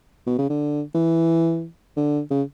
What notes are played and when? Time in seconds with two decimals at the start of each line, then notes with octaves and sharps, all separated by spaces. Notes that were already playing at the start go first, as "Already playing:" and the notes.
0.27 B2
0.38 C#3
0.49 D3
0.95 E3
1.97 D3
2.31 C#3